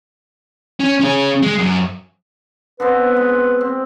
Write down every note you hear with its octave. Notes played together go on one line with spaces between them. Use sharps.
C#4
C#4 G#4
G#3
F#2
D3 B3 C4 B4
G#3
C4